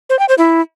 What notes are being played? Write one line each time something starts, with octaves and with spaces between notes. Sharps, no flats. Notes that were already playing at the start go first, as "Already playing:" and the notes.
C5
G5
C5
E4